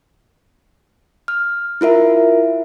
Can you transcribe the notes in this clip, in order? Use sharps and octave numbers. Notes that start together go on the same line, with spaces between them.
F6
E4 F4 A#4 E5